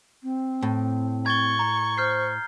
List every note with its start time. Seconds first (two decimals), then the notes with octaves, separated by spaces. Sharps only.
0.22 C4
0.63 A2
1.26 C#6 G#6 A6 G7
1.59 A#5
1.98 C5 F6 G6 C7